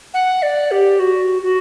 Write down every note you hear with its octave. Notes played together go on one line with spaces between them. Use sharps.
F#5
D5
G4
F#4
F#4